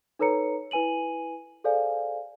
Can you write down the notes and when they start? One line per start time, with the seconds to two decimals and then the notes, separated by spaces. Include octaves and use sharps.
0.19 D#4 A4 B4 C#5 A#5 C#7
0.71 E4 B4 G#5 D#7 F#7
1.64 G#4 A4 C5 D5 F5 G#5